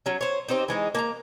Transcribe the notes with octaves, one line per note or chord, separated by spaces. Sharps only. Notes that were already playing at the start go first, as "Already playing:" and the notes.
F#3 C#4
C5 C#5
C4 D#4 G4 C5
E3 G#3 D#4
A#3 A5 A#5